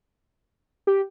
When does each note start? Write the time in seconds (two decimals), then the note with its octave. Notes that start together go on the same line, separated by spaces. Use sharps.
0.87 G4